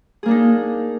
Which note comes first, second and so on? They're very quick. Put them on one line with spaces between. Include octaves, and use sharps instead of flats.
G#4 A#3 D4 D#4